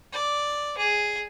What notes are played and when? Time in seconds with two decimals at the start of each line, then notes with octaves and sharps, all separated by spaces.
0.12 D5
0.78 G#4